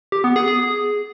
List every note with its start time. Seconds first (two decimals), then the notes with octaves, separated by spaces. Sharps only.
0.12 G4
0.24 B3
0.36 G#4
0.48 G#4